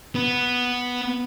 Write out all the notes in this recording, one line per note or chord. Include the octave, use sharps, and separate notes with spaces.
B3